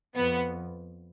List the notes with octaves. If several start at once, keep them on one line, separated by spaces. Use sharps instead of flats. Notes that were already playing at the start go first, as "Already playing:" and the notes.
F2 B3